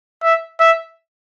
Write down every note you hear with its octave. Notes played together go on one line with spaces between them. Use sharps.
E5
E5